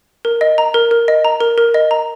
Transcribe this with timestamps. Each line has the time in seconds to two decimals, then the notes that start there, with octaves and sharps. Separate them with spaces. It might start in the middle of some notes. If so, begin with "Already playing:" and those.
0.25 A#4
0.41 D#5
0.58 A#5
0.74 A#4
0.91 A#4
1.08 D#5
1.25 A#5
1.41 A#4
1.58 A#4
1.74 D#5
1.91 A#5